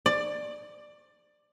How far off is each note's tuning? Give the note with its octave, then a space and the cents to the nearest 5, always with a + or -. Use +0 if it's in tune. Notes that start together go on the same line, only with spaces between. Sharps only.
D5 +15